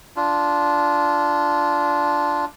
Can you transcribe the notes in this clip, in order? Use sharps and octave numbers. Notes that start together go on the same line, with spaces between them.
D4 F4